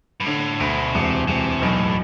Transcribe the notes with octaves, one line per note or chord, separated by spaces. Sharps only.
G2
A2 D3
D2 B2
E1 C3
E1 C3
B1 B2
A2